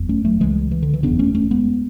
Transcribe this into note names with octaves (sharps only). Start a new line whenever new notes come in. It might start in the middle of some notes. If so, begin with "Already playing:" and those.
Already playing: F#1 E2
A3 C#4
F#3 A3
C#2 C#3 E3 G#3
E3
D3
E3
F#1 E2 C#3 B3 D4
A3 C#4
A3 C#4
G#3 B3